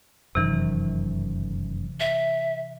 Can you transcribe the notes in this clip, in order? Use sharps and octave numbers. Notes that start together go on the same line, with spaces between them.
F1 F#2 C3 D#3 E3
E5